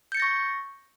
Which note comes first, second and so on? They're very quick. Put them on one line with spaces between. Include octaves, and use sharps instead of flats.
G6 C#7 A6 A#6 C#6